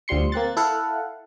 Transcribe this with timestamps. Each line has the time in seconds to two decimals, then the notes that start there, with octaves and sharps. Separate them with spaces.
0.08 D2 F3 G3 C6 C#7
0.32 A#3 C4 F#6 A6
0.57 E4 A4 F5 F#5